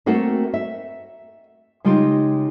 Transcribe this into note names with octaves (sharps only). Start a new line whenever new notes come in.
A3 A#3 C4 F#4 G#4 A#4
E5
C#3 G#3 D#4 F4 G4